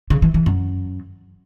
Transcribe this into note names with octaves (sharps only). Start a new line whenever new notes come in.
C#3
E3
E3
F#2